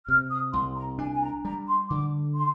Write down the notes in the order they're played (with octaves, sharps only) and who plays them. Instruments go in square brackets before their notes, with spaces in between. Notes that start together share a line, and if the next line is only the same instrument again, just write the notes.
[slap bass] C3 [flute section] F6
[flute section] D#6
[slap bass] C2 [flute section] C6
[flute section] A#5
[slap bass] D4 [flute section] G#5
[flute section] G#5
A#5
[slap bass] G3 [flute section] A#5
[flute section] C6
[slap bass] D3 [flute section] D6
[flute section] C6